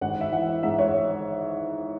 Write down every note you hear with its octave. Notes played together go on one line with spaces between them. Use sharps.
G#1 F#5
E5
E3 F#5
G#2 E5
C#5